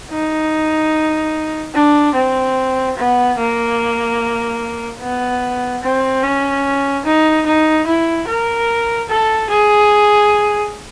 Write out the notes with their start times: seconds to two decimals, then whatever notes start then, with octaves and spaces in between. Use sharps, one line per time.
0.11 D#4
1.75 D4
2.15 C4
2.97 B3
3.38 A#3
5.01 B3
5.83 C4
6.23 C#4
7.05 D#4
7.46 D#4
7.86 E4
8.27 A#4
9.09 A4
9.49 G#4